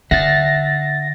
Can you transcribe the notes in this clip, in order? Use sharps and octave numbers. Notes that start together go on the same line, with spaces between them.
D3 E5 F#5 A6 A#6